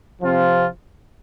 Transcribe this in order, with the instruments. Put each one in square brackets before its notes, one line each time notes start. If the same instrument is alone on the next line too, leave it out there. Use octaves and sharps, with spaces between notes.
[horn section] C3 F3 C4 F4